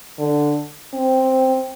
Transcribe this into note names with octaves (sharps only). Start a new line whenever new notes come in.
D3
C4